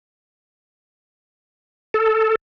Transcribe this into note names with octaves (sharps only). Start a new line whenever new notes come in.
A4